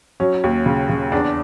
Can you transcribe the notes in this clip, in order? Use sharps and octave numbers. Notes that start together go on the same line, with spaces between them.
F#3 C#4
D#2
C#3
C#3
E2 D4